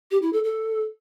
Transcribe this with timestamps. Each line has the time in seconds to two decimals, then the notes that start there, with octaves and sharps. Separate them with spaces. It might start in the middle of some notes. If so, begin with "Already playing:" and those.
0.11 G4
0.22 E4
0.33 A4
0.44 A4